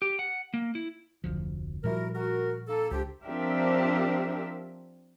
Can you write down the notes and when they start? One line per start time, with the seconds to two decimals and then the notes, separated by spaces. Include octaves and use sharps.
0.02 G4
0.19 F#5
0.54 A#3
0.75 E4
1.24 F1 D2 F3
1.84 A#2 F3 G3 E4 F#4 A#4
2.14 F#4 A#4
2.68 A#3 D#4 A4
2.91 C#2 F3 D4 G4
3.23 F3 C4 D4 G4 A#4 E5